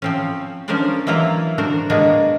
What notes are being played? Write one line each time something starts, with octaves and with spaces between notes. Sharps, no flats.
F3 C4 C#4
F3 C#4 D4 A#4 C5 D5
E3 F#3 A#3 E4 F4 A#5
D4 F#4 A#4 C5
G#3 A#3 B3 D4 F#4 G#4